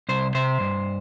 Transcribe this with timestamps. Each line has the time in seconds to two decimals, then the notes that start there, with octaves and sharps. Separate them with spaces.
0.09 C2 C5
0.35 C3 C5
0.60 G2